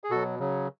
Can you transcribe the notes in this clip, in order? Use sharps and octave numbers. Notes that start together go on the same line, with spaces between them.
G#4
B2 F#3 F#4 A4
C#3 F#3